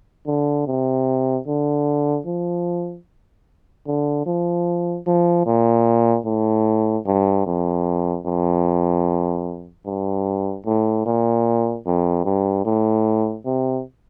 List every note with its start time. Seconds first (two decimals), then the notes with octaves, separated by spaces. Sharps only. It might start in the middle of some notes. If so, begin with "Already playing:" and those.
0.27 D3
0.67 C3
1.48 D3
2.26 F3
3.87 D3
4.27 F3
5.07 F3
5.46 A#2
6.26 A2
7.06 G2
7.47 F2
8.26 F2
9.86 G2
10.66 A2
11.06 A#2
11.86 F2
12.25 G2
12.65 A2
13.46 C3